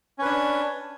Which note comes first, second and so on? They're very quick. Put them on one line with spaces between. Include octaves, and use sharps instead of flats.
C#4 B4 D4